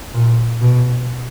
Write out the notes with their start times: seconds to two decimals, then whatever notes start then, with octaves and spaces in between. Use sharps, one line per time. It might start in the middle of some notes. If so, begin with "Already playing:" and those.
0.14 A#2
0.61 B2